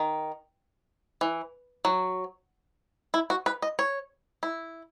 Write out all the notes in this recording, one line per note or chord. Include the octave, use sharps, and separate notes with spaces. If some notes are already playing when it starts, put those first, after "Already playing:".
Already playing: D#3
E3
F#3
E4
F#4
B4
D#5
C#5
E4